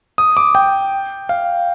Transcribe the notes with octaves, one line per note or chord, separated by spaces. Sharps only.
D#6
D6
G5
F5